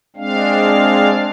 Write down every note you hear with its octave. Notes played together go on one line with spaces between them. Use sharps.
G#3 C4 D4 F5